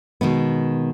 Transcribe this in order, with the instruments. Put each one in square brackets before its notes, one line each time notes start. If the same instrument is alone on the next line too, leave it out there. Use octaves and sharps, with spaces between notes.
[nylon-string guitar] B2 D#3 G#3 B3